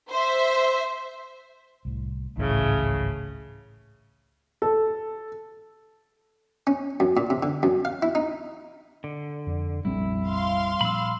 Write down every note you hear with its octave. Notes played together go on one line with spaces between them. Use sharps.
C5 E5
C2 A2
G#1 C#2 A2 C#3 E3
A4
C#4
F#2
A#2
C3
D3
F#2
F5
E4
D#4
D3
F2
F1 A#1 G3 C4 D4 E4
F5 C6
A#2 F3 D4 B5 E6